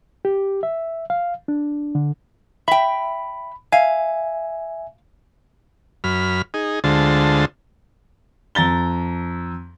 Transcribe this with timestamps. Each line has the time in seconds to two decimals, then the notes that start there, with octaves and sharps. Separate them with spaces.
0.25 G4
0.63 E5
1.10 F5
1.48 D4
1.95 D3
2.68 E5 G5 B5
3.72 E5 F5 G#5
6.04 F#2 B5 F6
6.54 D#4 G#4
6.84 D2 D3 G#3 F4 C5 A5
8.55 F2 A#5 A6 G7